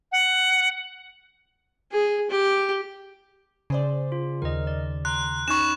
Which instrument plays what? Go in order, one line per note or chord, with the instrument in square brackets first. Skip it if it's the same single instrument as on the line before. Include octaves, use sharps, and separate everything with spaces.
[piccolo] F#5
[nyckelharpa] G#4
G4
[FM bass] C#3 [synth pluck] G#4 C5 D5
[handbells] F4
[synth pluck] D#2 D#3 [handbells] A#4 D#5
[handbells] D5
[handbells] A#5 C6 [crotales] F#6
[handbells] C#4 D#4 B5 [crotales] C#6 E7